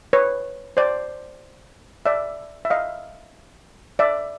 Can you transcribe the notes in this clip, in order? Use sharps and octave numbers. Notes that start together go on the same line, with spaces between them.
B4 C#5
C5 D5
D5 E5
E5
D#5 F5
D5 E5